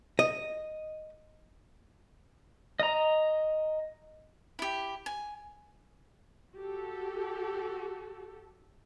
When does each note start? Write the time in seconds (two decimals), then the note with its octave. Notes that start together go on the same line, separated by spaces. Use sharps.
0.19 D#5
2.80 D#5 A#5
4.59 E4 G4
5.06 G#5
6.55 F#4 G4 A4